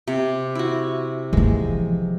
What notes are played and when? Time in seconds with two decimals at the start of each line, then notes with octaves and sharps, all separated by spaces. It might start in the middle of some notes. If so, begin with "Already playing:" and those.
0.08 C3
0.55 E4 F#4
1.33 E3 F3 G#3